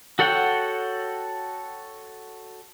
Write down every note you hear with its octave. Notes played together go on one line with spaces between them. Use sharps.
F#4 A4 C#5 F#5 G5